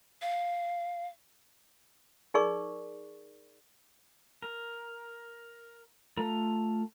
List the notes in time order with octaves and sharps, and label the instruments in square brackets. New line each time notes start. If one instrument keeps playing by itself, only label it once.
[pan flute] F5
[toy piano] D#4 G#4 A#4 D5 C#6
[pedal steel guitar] A#4
A3 F4 A4 A#5